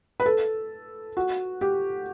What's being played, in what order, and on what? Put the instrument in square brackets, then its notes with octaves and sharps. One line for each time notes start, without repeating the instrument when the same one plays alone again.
[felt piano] B4
A4
F#4
G4